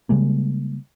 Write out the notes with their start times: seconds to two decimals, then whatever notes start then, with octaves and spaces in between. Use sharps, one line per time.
0.09 C#3 G3 G#3 A#3